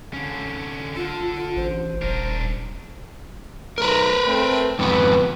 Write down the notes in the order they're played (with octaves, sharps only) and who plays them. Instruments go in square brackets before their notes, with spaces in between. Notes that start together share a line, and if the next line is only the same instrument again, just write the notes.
[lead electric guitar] D3 C#4
[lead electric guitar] D3 A4 [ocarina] F4
[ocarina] F4
[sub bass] A1 [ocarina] C5
[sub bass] D#1 [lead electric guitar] D4 A#4
[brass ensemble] B1 A3 A#5 [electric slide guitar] A#4 B4
[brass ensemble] A3 C4
[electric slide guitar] F2 G#2 B3 [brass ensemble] B4